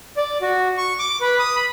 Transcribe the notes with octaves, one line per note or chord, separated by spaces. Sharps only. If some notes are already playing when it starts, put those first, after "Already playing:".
D5
F#4
C#6
D6
B4
D#6
B5